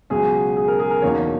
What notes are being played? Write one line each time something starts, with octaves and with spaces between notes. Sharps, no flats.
C#2 B2 F#3 C#4 G#4
G#4
A#4
G#4
A#4
F#1 E2 B2 A#3 D#4 C#5